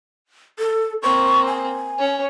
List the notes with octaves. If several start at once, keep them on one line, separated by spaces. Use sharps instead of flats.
A4
A#3 C4 C#6
G#5
C#4 C#5